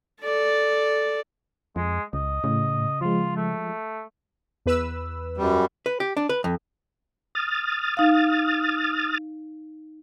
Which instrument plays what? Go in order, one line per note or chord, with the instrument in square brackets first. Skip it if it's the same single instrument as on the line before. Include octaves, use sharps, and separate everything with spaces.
[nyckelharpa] A4 D5
[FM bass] F2 [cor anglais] G#3
[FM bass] C#2 [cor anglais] D#5
[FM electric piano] A2 [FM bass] C#3
[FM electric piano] F3 G#3 [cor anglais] F4
[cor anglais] A3
[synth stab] E2 B4 E6
[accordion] F#2 G3
[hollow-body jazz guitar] B4
G4
D4
B4
F2
[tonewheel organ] D#6 F6 A6
[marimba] D#4 F5